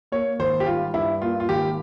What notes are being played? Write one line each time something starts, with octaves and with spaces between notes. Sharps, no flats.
A#3 C#5
G#1 C5
G4
G3 F4
G2 E4
A#3 F4
F4
G#1 G4